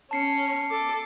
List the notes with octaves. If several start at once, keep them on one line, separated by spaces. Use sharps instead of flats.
C#4 A5 C7 C#7
A4 D6